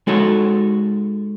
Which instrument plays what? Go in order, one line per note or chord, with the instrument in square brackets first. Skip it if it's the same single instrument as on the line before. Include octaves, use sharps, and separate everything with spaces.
[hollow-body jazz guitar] G#3 D#4 F#4 A4 C#5